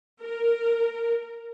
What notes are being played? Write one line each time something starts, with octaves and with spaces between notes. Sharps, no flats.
A#4